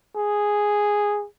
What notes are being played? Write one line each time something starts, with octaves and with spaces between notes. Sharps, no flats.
G#4